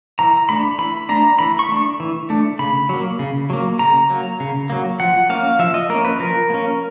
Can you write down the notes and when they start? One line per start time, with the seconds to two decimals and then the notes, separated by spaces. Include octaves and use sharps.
0.19 E3 A#5
0.49 A3 D4 B5
0.78 E3 B5
1.09 A3 D4 A#5
1.39 E3 B5
1.59 C#6
1.69 A3 D4
2.00 E3
2.30 A3 D4
2.59 C#3 B5
2.89 F#3 A#3
3.19 C#3
3.50 F#3 A#3
3.79 C#3 A#5
4.10 F#3 A#3
4.40 C#3
4.70 F#3 A#3
5.00 F3 F#5
5.30 A#3 C#4 F5
5.59 F3 E5
5.74 D#5
5.89 A#3 C#4 A#4
6.05 B4
6.20 F3 A#4
6.50 A#3 C#4